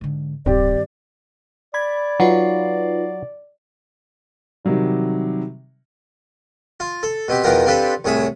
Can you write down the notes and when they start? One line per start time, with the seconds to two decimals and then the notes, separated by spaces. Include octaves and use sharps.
0.01 G#2 D3
0.46 D1 G2 D#3 C4 G4 D5
1.74 D5 B5 G#6
2.20 F#3 D#4 F4 B4
4.65 C3 D#3 F#3 G3
6.80 F4
7.03 A4
7.28 B2 C4 G4
7.44 E2 B2 F3 B3 A#4 G5
7.66 C4 D4 F4 G4 A4 B4
8.05 C2 A2 G#4 E5 G#5